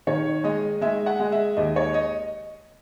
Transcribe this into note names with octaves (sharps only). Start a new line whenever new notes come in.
D#3 C#5
G#3 D#5
G#3 E5
F#5
G#3
E5
D#2 D#5
C#5
D#5